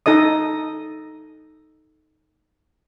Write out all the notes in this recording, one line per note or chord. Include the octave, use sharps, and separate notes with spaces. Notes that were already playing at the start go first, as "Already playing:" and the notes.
D#4 A4 D#5 D#6